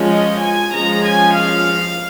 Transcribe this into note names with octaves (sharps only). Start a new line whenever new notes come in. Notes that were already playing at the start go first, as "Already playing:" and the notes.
Already playing: F3 G#3 C#4
D#5
G#5
F3 G#3 C#4 A#5
G#5
F5